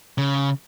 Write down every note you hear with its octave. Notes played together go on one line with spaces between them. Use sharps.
C#3